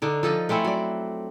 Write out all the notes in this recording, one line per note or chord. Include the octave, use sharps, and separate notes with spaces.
D3 D4 D#4
F3 A4 D#5
A3 C4 C#4 E4
F#3 D5